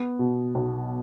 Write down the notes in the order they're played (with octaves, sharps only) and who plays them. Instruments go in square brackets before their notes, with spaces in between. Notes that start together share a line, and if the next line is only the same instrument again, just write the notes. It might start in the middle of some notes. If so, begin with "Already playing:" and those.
Already playing: [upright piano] B3
B2
B1